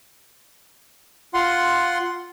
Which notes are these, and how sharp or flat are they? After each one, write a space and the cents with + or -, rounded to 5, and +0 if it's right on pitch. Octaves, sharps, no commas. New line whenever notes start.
F4 +5 F#5 +0 C6 +0